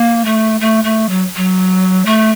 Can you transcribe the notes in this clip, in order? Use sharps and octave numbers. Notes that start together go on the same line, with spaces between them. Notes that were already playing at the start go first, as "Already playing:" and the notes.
Already playing: A#3
A3
A3
A3
F#3
F#3
A3